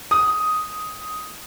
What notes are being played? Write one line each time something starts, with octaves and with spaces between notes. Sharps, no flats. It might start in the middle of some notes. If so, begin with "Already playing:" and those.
D#6